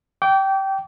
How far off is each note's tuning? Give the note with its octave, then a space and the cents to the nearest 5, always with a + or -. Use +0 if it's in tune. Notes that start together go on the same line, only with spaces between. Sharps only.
G5 -15 D6 -30